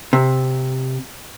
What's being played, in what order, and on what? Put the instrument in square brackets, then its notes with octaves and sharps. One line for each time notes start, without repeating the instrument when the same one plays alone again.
[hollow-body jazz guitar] C3